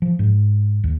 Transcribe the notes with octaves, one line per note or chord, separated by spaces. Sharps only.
F3
G#2
D#2